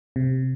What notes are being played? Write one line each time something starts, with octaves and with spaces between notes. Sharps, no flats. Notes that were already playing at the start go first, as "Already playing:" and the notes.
C3